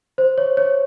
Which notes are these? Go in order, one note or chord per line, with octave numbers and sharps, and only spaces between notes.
C5
C#5
C#5